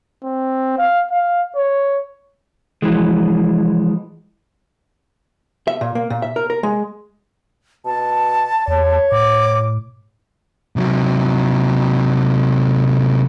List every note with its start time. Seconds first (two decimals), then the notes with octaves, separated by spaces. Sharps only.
0.24 C4
0.78 F5
1.11 F5
1.56 C#5
2.82 E3 F3 G#3
5.68 E5
5.81 A#2
5.95 A#3
6.10 A#2
6.22 E5
6.36 A#4
6.50 A#4
6.63 G#3
7.86 B2 A5
8.68 E2 C#5
9.12 A2 D6
10.76 C3 F#3